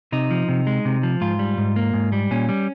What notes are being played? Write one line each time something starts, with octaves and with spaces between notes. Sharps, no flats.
C3 D#4
F3
C3
G#3
C3
F3
G#2 F4
G3
G#2
A#3
G#2
G3
A#2 C#4
G3